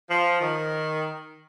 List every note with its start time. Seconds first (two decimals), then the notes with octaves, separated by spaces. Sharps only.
0.10 F3
0.41 D#3